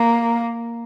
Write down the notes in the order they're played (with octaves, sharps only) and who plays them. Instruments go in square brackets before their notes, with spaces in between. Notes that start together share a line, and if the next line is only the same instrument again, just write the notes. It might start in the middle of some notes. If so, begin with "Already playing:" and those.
Already playing: [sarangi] A#3